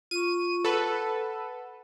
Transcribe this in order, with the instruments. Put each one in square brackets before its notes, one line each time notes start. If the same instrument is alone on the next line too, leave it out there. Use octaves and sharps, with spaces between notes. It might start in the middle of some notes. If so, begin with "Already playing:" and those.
[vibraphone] F4 C#6 [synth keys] D#7
[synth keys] A4 B4 [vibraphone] F#5